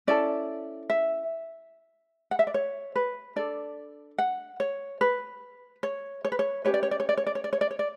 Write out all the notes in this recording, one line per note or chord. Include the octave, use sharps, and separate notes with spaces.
C#4 E4 A4 D5
E5
F#5
E5
D5
C#5
B4
D4 A4 D5
F#5
C#5
B4
C#5
C#5
B4
C#5
C#4 E4 G4 B4 C#5
D5
C#5
D5
C#5
D5
C#5
D5
C#5
D5
C#5
D5
C#5
D5